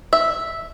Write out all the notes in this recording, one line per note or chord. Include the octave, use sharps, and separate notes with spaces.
E5